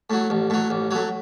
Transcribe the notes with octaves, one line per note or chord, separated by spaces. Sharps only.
A2 F#3
A1
A2 F#3
A1
A2 F#3